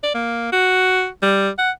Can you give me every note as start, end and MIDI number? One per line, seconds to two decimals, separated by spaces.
0.03 0.11 74
0.14 0.52 58
0.52 1.08 66
1.22 1.50 55
1.58 1.71 78